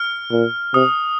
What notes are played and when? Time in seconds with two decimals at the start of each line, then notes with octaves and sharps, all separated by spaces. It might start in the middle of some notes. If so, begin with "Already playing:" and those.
Already playing: F6
0.31 A#2
0.74 C3 D#6